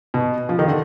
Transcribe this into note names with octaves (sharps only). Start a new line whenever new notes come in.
B2
F3
D#3
D3